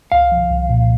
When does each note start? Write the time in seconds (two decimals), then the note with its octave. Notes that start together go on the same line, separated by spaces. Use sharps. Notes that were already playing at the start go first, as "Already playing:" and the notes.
0.12 C2 F5
0.32 F3
0.51 C2
0.70 A#2